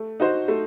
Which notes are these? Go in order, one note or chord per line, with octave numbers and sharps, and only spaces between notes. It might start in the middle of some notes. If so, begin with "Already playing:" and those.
Already playing: A3
D#4 F#4 C5
A3